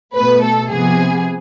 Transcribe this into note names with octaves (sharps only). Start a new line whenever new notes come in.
B2 A3 B4
A4
C3 F3 B3 G#4